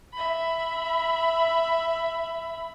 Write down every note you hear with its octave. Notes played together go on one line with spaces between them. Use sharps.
E5 B5